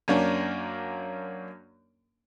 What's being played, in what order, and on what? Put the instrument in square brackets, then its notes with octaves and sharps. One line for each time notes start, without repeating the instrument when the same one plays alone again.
[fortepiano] F#2 A#3 C#4 D4